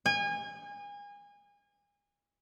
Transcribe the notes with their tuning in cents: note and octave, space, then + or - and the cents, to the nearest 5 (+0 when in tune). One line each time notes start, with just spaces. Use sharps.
G#5 -30